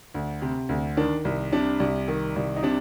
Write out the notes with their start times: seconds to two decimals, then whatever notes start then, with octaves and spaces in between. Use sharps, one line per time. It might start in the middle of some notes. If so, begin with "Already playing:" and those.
0.14 D2
0.42 C3
0.69 D2
0.97 D#3 D4
1.25 C2
1.52 C3 D4
1.80 C2
2.08 D#3
2.36 C2
2.56 D#4
2.63 C3 D4